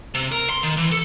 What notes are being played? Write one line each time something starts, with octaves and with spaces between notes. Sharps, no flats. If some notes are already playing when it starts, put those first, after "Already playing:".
C3
A#4
C6
D#3
E3
A4